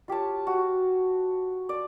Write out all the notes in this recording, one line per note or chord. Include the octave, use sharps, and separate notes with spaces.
F4 G4 C#5 A5
F#4
D5